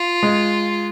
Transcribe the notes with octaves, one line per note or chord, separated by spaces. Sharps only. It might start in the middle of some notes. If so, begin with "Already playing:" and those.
Already playing: F4
G#3